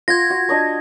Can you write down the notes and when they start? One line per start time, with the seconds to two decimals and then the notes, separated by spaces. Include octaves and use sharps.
0.08 F4 F#5 C6 G#6 A#6
0.30 F#4
0.49 D4 D#5 C#6